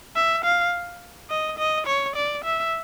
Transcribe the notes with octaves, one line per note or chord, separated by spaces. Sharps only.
E5
F5
D#5
D#5
C#5
D5
E5